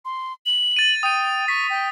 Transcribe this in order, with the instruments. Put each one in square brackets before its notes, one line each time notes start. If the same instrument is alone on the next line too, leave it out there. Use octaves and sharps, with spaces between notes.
[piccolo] C6
F#7
[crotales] A6 D#7
[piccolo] G5 [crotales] D#6 D#7
[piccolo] C#6 [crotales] B6
[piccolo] G5